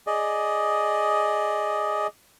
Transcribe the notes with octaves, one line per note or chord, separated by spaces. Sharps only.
G#4 D5 D#5